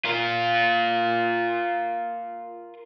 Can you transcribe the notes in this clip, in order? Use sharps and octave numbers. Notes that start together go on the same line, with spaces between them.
F4 A#4